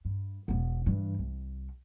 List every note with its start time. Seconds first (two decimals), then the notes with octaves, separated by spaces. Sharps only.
0.05 G2
0.48 E1 B3
0.86 G2 E3
1.19 C2